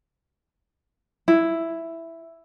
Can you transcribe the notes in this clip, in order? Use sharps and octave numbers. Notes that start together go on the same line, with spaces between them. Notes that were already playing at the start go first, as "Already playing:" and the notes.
E4